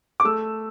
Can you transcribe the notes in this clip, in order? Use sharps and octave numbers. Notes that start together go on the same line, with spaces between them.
D6
A3 E6